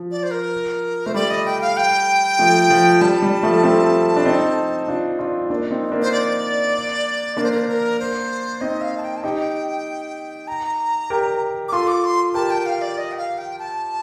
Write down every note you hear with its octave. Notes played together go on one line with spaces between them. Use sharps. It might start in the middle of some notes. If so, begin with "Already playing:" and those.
Already playing: F3
D5
C5
A#4
A3 C5
G3 D5
D#5
G5
F5
G5
F3 A3
F3
G3 A5
G3
F3 A3
A3 C4
D4
C4 D#4
D4 F4
D4 F4
D#4
A#3 D4
C4 D#4
A#3 D4
C5
D5
A#3 D4 D5
C5
A#4
C5
A#4
C5
C4 D#4 D#5
F5
A5
G5
A5
D#4 G4 G5
A#5
G4 A#4
D6
F4 A4 C6
D6
C6
G4 A#4 A5
G5
F5
D5
D#5
G5
F5
G5
A5